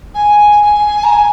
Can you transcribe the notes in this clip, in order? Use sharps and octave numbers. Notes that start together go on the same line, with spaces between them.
G#5
G#5
A#5
G#5